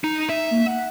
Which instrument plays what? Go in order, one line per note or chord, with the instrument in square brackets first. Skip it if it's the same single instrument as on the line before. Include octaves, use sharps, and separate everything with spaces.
[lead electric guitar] D#4
E5
[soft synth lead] A#3
F#5